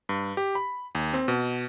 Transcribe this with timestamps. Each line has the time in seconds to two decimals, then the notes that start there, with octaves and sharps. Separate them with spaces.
0.09 G2
0.37 G4
0.55 B5
0.95 D#2
1.13 C4
1.28 B2